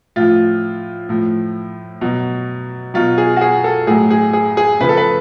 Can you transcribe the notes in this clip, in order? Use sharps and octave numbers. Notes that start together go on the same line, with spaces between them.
A2 F3 F4
A2 F3
B2 F#3
B2 F#3 F4
G#4
F#4
G#4
A4
A2 F#3 G#4
G#4
G#4
G#4
C#3 F3 B4
A4
B4